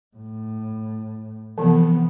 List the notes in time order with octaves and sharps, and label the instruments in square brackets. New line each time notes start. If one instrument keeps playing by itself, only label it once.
[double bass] A2
[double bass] C3 B3 [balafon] E3 F3